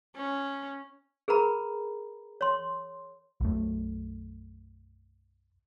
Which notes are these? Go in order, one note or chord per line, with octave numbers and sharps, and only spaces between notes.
C#4
G#4 A#4 B4 A#5 B5
C#5 C6
B1 F#2 A3